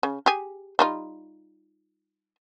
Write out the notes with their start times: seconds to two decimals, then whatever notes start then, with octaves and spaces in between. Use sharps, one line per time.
0.03 C#3
0.26 G4 G#4
0.79 G3 D#4 F4